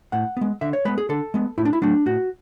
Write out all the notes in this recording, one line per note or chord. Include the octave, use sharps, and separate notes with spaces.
A2 F#5
G#3 B3
D3 E5
C#5
G#3 B3 B4
G#4
D3 A4
G#3 B3
A2 E4
D4
E4
F#3 A3 D4
A2 F#4